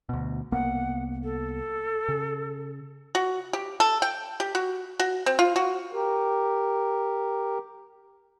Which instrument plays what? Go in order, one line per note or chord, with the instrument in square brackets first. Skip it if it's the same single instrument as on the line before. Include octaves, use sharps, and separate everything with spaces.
[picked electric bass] D2 B2
[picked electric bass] C2 A#3 B3 [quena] F#5
[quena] A4
[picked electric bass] C#3
[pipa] F#4
G4
A4
G5
G4
F#4
F#4
C4
F4
F#4
[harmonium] G4 A#4